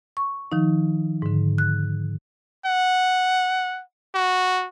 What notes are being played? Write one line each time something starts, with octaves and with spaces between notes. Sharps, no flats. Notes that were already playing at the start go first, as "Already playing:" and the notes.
C#6
D#3 F3 D#4
G#2 D3
F#6
F#5
F#4